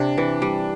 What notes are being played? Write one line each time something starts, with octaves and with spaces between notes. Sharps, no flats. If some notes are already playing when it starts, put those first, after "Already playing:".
Already playing: C3 D4
E3
G3